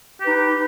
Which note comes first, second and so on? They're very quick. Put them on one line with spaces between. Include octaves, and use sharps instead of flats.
G4 B4 D#4